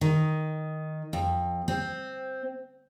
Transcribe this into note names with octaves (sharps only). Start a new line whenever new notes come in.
D#3
F2
C4